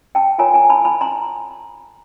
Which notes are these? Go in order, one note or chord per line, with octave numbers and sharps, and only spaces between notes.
G5 A5
F4 A#4 C#5 G#5 A#5
G#5 A#5
A5 B5
A5 B5
A#5 C6